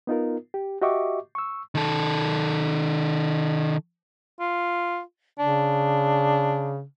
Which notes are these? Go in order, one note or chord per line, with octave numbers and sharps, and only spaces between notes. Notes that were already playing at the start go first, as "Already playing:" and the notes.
B3 D#4 F4 A#4
G4
F#4 G4 D#5 E5 C#6 D6
C#6 E6
D#3 A4
F4
C#3 D4